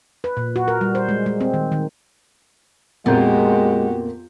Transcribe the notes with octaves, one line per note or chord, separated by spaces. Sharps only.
B4
A#2
F#4
A#4
G3
C5
G#3
G#3
C4
D#3
D#3
F2 A#2 G#3 B3 F#4 G4 G6